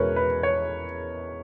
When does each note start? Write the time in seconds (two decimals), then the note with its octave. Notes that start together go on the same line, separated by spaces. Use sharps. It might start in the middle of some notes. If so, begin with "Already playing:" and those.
Already playing: E2 B2 G#3 C#4 E4 A#4 B4 C#5
0.16 B4
0.43 C#5